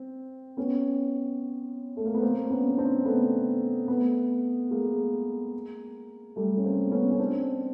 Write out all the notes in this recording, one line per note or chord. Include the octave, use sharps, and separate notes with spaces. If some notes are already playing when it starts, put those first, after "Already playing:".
Already playing: C4
B3 C#4
A3
A#3
B3
A#3 C4
B3 C#4
C4 D4
A3 B3
A3 B3
G#3 A#3
G3 A3
C#4
A#3 C4
B3 C#4
C#4
C4 D4